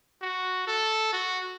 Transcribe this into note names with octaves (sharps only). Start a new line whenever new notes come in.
F#4
A4
F#4